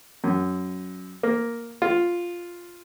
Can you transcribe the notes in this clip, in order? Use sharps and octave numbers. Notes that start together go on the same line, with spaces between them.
F#2
A#3
F4